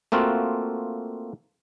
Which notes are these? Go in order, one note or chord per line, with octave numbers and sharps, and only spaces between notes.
A3 A#3 C4 F4 F#4